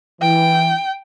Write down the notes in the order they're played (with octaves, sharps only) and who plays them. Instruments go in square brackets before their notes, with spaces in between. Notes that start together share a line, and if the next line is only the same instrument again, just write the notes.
[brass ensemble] E3 [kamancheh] G5